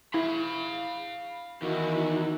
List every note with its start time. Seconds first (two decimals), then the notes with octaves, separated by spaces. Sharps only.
0.14 E4 F5 B5
1.62 E2 D#3 E4 F#4